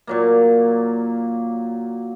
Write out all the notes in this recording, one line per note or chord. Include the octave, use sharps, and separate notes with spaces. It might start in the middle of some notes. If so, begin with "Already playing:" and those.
A#2 F#3 A#3